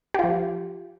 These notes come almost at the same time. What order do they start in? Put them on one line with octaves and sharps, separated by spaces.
G4 F4 F3